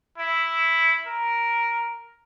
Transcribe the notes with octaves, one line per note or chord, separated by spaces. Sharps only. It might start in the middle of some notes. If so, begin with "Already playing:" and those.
E4
A#4